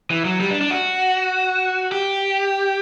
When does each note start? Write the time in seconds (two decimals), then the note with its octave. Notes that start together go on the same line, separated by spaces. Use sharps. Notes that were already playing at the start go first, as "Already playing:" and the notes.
0.11 E3
0.25 F#3
0.40 G3
0.51 D4
0.61 D4
0.71 F#4
1.92 G4